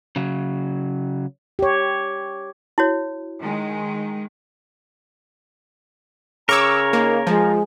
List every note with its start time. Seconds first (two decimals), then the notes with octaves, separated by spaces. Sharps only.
0.16 C#3 F#3
1.59 G4 C#5
2.78 E4 F#4 C#5
3.40 D#3 G#3
6.49 C#3 A#4 C#5 A#5 C#6 D6 E6
6.93 A#3 D#4
7.27 F3 G#3